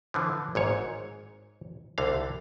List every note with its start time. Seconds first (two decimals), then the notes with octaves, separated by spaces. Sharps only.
0.14 D3 E3 F3
0.55 G#1 G#2 C#5
1.98 C2 D3 F5